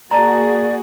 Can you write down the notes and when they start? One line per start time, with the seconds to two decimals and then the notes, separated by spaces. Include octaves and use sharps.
0.11 A#3 F#4 G#4 D5 A5 A#5